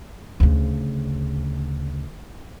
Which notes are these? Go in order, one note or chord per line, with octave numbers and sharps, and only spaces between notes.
D2 C#3